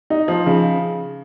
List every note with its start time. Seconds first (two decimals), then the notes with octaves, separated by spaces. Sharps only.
0.10 D#4
0.28 F3
0.46 C#3